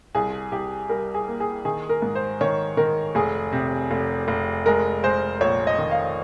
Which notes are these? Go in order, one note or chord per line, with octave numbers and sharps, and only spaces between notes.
C2 G#4
C2 G4
G3 A#4
G#4
A#3
G#4
D#3 G#4
A#4
G#2
C5
D#3 C#5
D#3 A#4
F1 G#4
C3
F1
F1
G#3 A#4
G#3 C5
A#1 C#5
D#5
D#3
F5